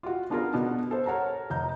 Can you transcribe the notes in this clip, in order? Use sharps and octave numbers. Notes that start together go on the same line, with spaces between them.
F4 F#4
B3 D4 F4 G#4 A#4
B2 B3 D4
A4 C5
A#4 C#5 F#5 A5 A#5
F1 A#5 G6